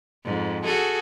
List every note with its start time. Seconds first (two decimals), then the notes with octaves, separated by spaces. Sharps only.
0.25 F2 G#2
0.64 F#4 G#4 A4